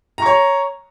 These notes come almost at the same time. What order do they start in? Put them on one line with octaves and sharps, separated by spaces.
A#5 C#6 C#5